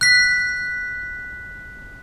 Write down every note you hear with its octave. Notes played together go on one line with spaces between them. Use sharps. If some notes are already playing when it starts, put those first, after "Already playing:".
F#6 B6